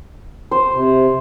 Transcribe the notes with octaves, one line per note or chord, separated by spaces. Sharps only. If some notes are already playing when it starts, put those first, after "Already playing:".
C5
C3